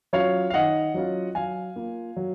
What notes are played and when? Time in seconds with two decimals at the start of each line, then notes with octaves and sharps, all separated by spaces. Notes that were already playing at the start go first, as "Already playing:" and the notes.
0.13 F#3 C#4 F4 C#5 F5
0.50 F5
0.54 D#3 D#5 F#5
0.94 F#3 C#4 F4
1.35 F#3 F5 G#5
1.76 A#3 F4
2.16 F#3